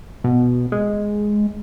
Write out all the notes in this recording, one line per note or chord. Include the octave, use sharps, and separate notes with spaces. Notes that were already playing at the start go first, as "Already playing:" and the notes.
B2
G#3